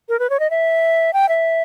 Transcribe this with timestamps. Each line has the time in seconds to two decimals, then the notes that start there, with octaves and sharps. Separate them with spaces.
0.09 A#4
0.19 B4
0.30 C#5
0.40 D#5
0.50 E5
1.13 G5
1.29 E5